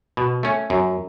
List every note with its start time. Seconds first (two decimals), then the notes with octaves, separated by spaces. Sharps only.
0.17 B2
0.43 A3 C#4
0.70 F#2